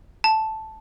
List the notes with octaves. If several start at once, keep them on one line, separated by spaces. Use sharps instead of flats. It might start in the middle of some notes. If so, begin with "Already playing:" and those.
A5